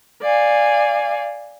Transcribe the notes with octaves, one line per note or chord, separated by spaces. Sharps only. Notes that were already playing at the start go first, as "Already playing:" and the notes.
D5 F5 G#5